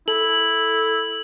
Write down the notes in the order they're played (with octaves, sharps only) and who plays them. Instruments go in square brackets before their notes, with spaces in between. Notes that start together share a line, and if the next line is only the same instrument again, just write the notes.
[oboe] E4 [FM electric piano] A4 [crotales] F#7